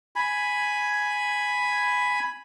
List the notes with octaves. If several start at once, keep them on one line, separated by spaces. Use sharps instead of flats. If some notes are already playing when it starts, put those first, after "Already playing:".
G#5 B5